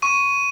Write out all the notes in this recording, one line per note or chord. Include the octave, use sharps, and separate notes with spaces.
C#6 D#7